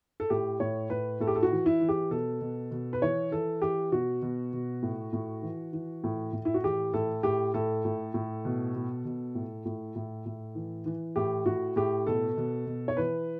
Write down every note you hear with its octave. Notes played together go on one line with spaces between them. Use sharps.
A4
A2 G4
A2 C#5
A2 B4
A2 A4
G4
A4
F#4
E3
E4
E3
G4
B2 A4
B2
B2
B4
E3 C#5
E3 A4
E3 G4
B2 F#4
B2
B2
A2
A2
E3
E3
A2
A2
E4
F#4
E3 G4
A2 A4
A2 G4
A2 A4
A2
A2
B2
B2
B2
A2
A2
A2
A2
E3
E3
A2 G4
A2 F#4
A2 G4
B2 A4
B2
B2
C#5
E3 B4